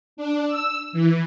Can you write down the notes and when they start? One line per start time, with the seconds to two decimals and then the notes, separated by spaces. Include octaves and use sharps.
0.17 D4
0.48 E6
0.93 E3